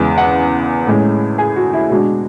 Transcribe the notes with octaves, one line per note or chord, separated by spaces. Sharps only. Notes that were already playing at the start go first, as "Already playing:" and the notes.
Already playing: E2 C#3 G#3
F#5
A2 G#3 C#4
G#4
F#4
E4
B2 G#3 D4 F#4